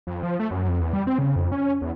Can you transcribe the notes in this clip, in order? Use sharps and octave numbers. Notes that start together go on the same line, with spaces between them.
F2
F3
A3
F#2
F2
E2
G3
C4
C#3
F2
C#4
E2